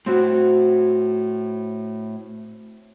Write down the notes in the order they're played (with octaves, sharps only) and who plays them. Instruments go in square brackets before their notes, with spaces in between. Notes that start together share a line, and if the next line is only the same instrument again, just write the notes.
[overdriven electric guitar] A2 [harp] C4 F#4